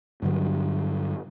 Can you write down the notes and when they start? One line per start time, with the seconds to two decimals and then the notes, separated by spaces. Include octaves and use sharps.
0.22 G2 D3 F#3